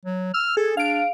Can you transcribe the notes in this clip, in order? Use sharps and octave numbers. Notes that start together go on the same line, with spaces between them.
F#3
E6 F6
G#4 A4
D4 F5 D7